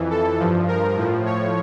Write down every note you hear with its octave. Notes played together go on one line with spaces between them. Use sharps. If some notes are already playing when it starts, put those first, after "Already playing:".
Already playing: F2 E3
A4
G2 F3
A#4
A2 F3
C#5